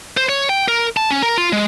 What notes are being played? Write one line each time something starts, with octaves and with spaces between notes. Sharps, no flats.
C5
C#5
G5
A#4
A5
C#4
A#4
F4
G#3